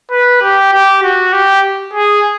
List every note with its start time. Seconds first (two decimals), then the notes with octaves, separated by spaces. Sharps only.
0.11 B4
0.42 G4
0.72 G4
1.03 F#4
1.33 G4
1.93 G#4